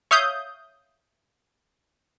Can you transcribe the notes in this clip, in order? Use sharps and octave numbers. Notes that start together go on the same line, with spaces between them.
C#5 E5 F5 D#6 G6